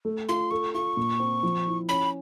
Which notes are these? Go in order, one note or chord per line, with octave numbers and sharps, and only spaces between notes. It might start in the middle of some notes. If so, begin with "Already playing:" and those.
A3
F4 C6
A4 C#6
F4 C#6
A#2
C4
F3
E4
C#4 B5